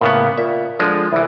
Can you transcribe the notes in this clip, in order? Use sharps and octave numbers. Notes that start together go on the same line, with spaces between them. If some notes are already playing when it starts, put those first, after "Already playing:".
A2 C#3 A#3 B3
A#2 E5
D3 F3 G#3
C2 E3 E4